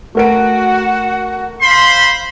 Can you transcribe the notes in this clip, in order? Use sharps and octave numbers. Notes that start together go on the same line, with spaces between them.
A3 F#4 A#4 D7
C5 F5 B5 C6